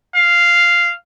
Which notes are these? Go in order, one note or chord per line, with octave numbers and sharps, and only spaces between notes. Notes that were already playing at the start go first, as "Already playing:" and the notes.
F5